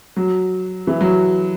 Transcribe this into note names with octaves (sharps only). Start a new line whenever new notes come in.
F#3
E3
F#3